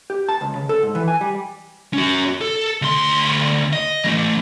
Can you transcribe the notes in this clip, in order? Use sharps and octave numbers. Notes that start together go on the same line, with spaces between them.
G4
A5
C#2
C#3
A4
G#2
E3
G#5
G3
C#4 F#4
A4
D2 C6
D#5
E3 A3